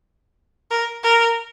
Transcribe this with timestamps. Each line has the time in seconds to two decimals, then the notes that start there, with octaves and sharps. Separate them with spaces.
0.71 A#4
1.04 A#4